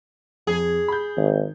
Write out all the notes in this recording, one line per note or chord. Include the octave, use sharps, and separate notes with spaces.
F2 G#4
B5 G6
G#1 D#3